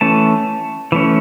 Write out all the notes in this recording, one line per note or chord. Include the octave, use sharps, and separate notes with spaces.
E3 A3 C#4 A5
E3 A3 C#4